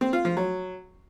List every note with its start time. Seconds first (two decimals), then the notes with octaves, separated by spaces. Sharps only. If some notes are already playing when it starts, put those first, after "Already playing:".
0.01 C4
0.13 F4
0.25 F3
0.37 F#3